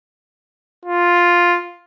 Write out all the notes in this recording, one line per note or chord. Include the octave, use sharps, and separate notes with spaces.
F4